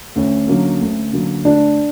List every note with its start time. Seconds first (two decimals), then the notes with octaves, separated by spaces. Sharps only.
0.16 D2 C#4
0.47 D3 F#3 A#3
0.81 D2
1.13 D3 F#3 A#3
1.44 D2 D4